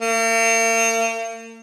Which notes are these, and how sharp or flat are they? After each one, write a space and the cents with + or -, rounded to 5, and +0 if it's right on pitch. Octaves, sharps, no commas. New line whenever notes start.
A#3 -45